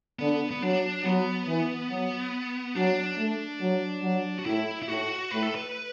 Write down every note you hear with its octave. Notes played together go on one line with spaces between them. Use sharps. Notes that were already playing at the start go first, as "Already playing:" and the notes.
D3 B3
B3
F#3 D4
F#3 B3
E3
F#3
F#3 D4
A3
F#3
F#3
F#4
A2 E4
E4
A2 F#4
A2 B4
A4
B4